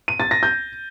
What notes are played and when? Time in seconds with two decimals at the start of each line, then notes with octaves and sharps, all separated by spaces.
0.08 D#7
0.20 A6
0.31 A#6
0.43 G6